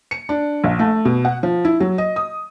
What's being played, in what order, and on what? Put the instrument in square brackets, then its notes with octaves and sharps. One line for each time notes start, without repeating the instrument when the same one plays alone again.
[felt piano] C#7
D4
A#1
A3
B2
F#5
F3
E4
F#3
D#5
D#6